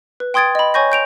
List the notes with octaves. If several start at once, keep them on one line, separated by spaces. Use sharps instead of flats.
B4
G5 C6 D#6 G#6 A6 D7
D#5 B5
C#5 G#5 C#6 G6 A#6
G6 D7 F7